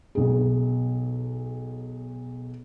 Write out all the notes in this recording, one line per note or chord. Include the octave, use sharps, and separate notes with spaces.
B1 G#4